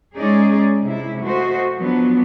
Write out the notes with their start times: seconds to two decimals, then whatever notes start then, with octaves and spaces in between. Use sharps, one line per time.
0.16 G#3 C#4 D#4 G#4 D5
0.84 C3 G#3 E4
1.23 A3 F#4 C5 D#5
1.78 F3 F#3 B3 D4